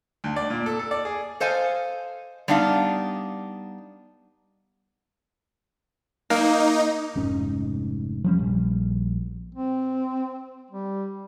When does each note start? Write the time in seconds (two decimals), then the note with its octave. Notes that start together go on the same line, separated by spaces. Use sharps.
0.24 D2
0.36 D5
0.50 A#2
0.66 A4
0.79 A4
0.91 D5
1.05 G#4
1.40 A4 C5 D#5 F5 G#5
2.48 G3 B3 D4 D#4 F5
6.30 A#3 D#4
7.15 F1 G#2 C#4
8.24 F3 G3 C#4
8.39 A#1 G3
9.55 C4
10.70 G3